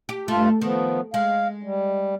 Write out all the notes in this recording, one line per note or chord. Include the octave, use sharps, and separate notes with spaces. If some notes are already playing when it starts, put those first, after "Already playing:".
G4
G2 A3 F4
D#3 F3 B3
G#3 F5
G3